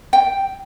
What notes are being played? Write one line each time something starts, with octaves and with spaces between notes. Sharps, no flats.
G5